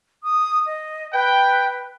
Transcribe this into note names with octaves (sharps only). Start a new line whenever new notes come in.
D#6
D#5
B4 G5